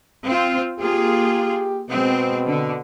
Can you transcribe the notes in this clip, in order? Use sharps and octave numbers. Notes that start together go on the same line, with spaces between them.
C4 F4
A#3 F4 G4 G#4
B2 G#3 C4
D3